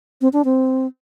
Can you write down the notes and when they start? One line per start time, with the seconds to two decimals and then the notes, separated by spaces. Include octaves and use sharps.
0.21 C4
0.33 D4
0.45 C4